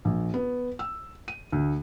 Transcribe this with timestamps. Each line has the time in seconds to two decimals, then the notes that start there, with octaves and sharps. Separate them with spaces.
0.05 A#1
0.34 B3
0.79 E6
1.28 D#7
1.52 D2